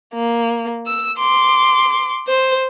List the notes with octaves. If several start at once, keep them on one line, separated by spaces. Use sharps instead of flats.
A#3
E6
C6 D6
C5